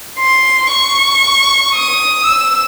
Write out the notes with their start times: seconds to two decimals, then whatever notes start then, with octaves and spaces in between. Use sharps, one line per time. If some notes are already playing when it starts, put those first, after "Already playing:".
0.19 C6
0.71 C#6
1.75 D#6
2.27 E6